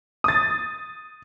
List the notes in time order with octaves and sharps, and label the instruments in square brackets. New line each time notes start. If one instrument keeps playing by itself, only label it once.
[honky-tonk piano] D#6 A6